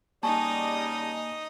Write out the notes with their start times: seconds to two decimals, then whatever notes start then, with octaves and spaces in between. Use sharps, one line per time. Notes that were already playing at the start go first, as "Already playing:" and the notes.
0.23 C#3 G3 A#3 D#4 D#5 G#5 A5 C#6